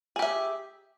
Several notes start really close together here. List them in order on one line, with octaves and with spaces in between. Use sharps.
G#4 G4 E5